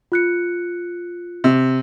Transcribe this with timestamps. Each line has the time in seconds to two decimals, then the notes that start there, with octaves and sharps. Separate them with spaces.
0.12 F4 F#6 C#7
1.44 C3